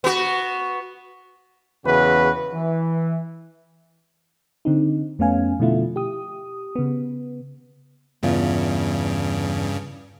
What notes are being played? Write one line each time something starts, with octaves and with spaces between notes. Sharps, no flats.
B3 F#4
E2 C#3 F#4 B4
E3
D3 C4 D#4
F2 A3 B3 C#4 F5 G#5
B2 D3 F3 A3 E4 F4
G4 D#6
C#3 B3
E2 G2 C#3 F4